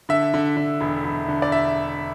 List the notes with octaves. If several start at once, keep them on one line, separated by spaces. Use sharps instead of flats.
D3 E5
D3
D3
E1
E1
D3
D5
E5